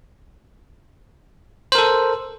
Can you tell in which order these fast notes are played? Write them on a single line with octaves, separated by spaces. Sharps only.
C5 A#4 A4